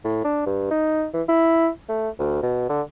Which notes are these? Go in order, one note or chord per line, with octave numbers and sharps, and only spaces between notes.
A2
D4
G2
D#4
E3
E4
A3
D2
B2
D3